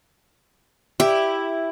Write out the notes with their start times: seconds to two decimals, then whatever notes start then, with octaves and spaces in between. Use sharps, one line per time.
1.00 E4 G4